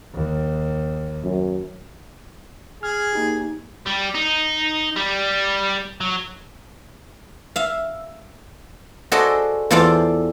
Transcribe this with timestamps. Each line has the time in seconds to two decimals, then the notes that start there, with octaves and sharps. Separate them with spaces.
0.15 D#2
1.24 F#2
2.83 G#4 F6
3.13 A#3 D#4 G4
3.86 G3
4.14 D#4
4.96 G3
6.01 F#3
7.56 E5 F5
9.12 F#4 G#4 A4 C5 D5 D#5
9.71 E2 F4 A4 C5 D5 F5